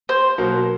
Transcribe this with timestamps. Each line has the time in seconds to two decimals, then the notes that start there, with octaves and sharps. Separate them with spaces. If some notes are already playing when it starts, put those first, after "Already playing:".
0.09 C5
0.38 B2 F#3 A#3